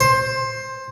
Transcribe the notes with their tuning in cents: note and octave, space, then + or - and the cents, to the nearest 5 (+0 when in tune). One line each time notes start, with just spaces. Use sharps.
C5 +15